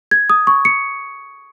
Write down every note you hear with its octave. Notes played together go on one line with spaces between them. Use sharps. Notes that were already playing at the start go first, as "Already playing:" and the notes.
G#6
D#6
C#6
C#7